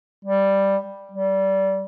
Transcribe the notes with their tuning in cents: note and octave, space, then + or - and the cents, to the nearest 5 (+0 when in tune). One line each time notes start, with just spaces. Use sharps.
G3 +0
G3 -25